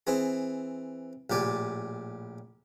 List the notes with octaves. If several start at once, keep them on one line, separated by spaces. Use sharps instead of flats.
E3 C4 G#4
A#1 A2 G4 D5 G#5